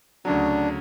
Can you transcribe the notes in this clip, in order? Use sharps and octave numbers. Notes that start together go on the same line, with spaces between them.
D2 C#3 F#3 D4